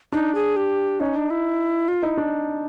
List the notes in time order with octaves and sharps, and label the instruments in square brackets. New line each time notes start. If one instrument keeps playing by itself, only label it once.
[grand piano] D4 [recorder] D#4
[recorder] G#4
G4
[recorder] C#4 [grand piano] D#4
[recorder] D4
E4
F4
[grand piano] D#4 [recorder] E4
[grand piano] D4